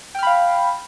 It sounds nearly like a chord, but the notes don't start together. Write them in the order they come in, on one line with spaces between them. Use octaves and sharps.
G5 F6 B5 F5